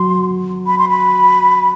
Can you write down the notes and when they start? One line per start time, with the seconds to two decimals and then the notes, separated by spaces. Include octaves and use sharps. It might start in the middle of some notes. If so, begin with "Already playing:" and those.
Already playing: F#3 C6
0.67 B5
0.79 C6
0.89 B5